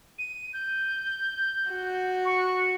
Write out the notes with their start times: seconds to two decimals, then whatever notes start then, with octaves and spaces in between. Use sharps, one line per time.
0.18 D#7
0.53 G6
1.70 F#4
2.25 C#6